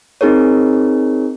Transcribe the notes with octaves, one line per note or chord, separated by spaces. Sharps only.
C4 D#4 G#4 A#4 C#5